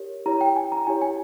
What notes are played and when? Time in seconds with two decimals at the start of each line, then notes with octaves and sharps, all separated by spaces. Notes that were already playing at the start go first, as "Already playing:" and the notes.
Already playing: G4 A#4 C#5
0.26 E4 G4 C#5 A#5
0.41 G5
0.56 G#5
0.72 A#5
0.87 E4 G4 C#5 G#5
1.02 G#5